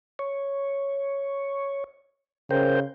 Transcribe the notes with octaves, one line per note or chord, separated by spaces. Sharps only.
C#5
C#3 A#4 C5 G5